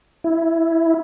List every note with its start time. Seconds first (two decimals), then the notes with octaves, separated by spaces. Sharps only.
0.24 E4